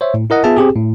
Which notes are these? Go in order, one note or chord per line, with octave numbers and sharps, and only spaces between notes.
C5 C#5 E5
A2
E4 A#4 D#5 F#5
B3 F4 G#4 E5 A5
C4 G4 G#4
A2